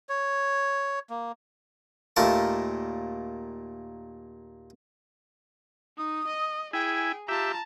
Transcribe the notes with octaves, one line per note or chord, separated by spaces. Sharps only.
C#5
A#3
D#2 A#2 A3 A#4 A5
D#4 D#6
D#5
E4 G#4 G5 G#5
F4 G4 E5 A5 A#5